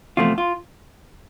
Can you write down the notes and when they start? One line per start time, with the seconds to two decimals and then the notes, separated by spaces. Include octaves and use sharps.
0.17 E2 C3 F3 A3 F4
0.38 F4